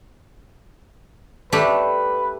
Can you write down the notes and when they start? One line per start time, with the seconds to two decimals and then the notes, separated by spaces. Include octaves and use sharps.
1.53 A3 D4 G4 B4